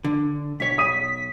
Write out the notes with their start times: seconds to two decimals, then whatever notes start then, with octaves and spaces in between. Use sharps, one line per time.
0.04 D3
0.60 B1 C#5 B6
0.78 D#6 D#7